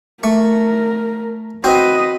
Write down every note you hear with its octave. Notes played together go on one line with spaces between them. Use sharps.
A3 A#4 C#6
C4 F#4 B4 C5 D#5